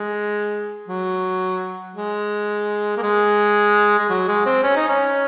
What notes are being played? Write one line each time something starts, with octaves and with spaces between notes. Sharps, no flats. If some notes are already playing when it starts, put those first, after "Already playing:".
Already playing: G#3
F#3
G#3
A#3
G#3
G#3
F#3
G#3
C4
C#4
D#4
C#4